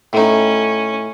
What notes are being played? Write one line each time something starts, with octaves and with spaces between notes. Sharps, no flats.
A2 C#4 D#4